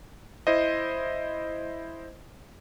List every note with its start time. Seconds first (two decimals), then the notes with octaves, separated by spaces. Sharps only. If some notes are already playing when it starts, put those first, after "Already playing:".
0.47 E4 C5 D#5